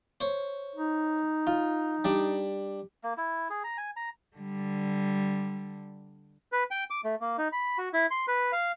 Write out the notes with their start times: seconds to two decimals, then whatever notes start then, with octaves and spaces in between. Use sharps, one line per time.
0.21 C5 C#5
0.76 D#4
1.47 F4
2.05 G3 D4
3.04 A#3
3.17 E4
3.50 G#4
3.64 A#5
3.77 G#5
3.96 A#5
4.36 D3 G3
6.52 B4
6.71 G5
6.90 D6
7.05 A3
7.21 A#3
7.38 D#4
7.52 B5
7.78 F#4
7.94 E4
8.11 C6
8.28 B4
8.52 F5